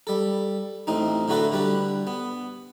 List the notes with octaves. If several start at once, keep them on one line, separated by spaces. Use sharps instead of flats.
G3 A4
A1 A2 C4 D#4
A2 D3 A3 F#4 A4 B4
D3 G3 B4
B3